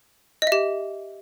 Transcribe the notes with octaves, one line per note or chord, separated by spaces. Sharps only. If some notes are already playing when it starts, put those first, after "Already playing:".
G4 D#5 E5